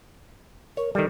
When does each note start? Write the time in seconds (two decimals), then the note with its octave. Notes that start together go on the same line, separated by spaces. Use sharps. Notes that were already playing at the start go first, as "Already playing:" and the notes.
0.77 A#4 C#5
0.95 D#3 G3 A4